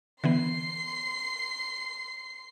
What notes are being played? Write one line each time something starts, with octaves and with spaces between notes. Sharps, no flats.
D3 E3 B3 C6 C7